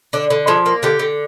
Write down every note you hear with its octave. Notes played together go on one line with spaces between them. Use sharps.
D3 D4
D3
F3 G#4
A#3
D3 G4
D3